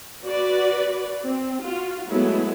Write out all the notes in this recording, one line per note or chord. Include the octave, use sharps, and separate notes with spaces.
F#4 B4 D5
C4
F4 F#4
F#3 G#3 A3 B3 E4